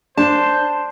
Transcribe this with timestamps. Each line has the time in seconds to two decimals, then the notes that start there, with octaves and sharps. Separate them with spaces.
0.17 D4 C5 A5